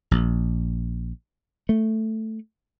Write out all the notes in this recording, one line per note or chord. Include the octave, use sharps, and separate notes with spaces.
A#1
A3